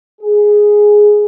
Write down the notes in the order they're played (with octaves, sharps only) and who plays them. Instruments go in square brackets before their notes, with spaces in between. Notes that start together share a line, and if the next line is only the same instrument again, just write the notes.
[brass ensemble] G#4